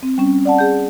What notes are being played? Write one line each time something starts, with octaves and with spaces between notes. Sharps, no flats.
C4
G3 C#4
D5 F#5 A5
G#4 G6